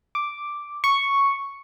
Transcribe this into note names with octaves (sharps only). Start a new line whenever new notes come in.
D6
C#6